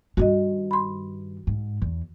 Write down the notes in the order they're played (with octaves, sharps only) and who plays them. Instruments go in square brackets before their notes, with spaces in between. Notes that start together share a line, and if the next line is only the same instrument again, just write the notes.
[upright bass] G2 D#3 [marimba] F#4 D#5
[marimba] B5 C6
[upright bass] G#2
E2